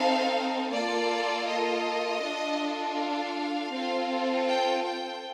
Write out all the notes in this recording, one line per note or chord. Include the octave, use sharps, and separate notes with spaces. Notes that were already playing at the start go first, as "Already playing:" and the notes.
Already playing: C4 D#4 A4 F5
A#3 F4 A4 D5
D#5
D4 F4 A4
F5
C4 F4 A4
G5
G5